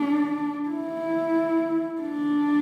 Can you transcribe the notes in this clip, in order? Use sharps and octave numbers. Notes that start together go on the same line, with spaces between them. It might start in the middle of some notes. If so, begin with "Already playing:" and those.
Already playing: D4
E4
D4